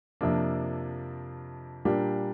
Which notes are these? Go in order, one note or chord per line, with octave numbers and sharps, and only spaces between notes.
F2 C3 F3 A#3 D4
A#2 G3 A#3 D4 G4